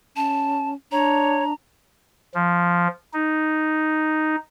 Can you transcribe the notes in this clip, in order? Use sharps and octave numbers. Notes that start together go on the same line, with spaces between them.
C#4 A5
D4 C#5 A#5
F3
D#4